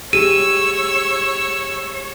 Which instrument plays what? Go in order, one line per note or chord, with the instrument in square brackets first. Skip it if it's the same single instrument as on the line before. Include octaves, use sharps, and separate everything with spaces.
[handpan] G4 G#4 [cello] C#5 [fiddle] E6 [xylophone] D#7